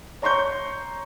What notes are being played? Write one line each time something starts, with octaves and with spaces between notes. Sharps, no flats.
C#5 A#5 C6 C#6 G6